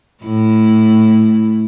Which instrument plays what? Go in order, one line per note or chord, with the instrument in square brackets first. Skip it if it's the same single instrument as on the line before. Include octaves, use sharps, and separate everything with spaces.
[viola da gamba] A2 E4